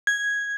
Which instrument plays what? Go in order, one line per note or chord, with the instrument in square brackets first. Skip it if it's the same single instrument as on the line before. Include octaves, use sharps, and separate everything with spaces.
[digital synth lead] G#6